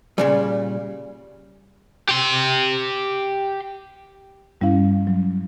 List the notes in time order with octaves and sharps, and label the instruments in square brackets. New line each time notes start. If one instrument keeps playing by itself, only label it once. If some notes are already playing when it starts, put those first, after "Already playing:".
[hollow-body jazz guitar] A#2 C#3 G3
[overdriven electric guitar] G4 C6
[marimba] G2 G3 C#4 E4 F5
F#3